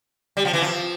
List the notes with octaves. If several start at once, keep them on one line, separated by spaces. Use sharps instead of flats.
G3
F3
E3
F3